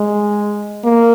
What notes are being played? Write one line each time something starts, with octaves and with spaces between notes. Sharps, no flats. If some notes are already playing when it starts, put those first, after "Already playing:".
Already playing: G#3
A#3